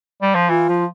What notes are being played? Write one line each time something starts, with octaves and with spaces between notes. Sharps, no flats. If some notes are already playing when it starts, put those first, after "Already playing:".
G3
F3
E3 F4
F3